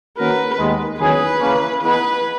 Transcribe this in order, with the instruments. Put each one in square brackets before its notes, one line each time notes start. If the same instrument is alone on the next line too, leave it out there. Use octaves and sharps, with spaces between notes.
[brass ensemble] D#3 A#3 C#4 F#4 A#4 [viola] B4
[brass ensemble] D#2 D#3 G#3 B3
[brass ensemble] E2 D#3 F#3 C#4 G#4 [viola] B4
[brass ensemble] C#3 E3 A#3 C#4
[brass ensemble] E3 B3 D#4 G#4 [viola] B4